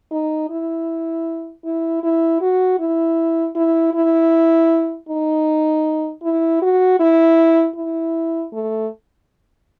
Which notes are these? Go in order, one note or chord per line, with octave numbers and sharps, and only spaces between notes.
D#4
E4
E4
E4
F#4
E4
E4
E4
D#4
E4
F#4
E4
E4
A3